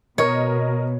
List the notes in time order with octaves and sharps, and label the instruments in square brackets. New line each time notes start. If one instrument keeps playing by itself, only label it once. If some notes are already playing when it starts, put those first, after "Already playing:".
[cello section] B2 [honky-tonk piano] A#4 D#5 [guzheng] C#5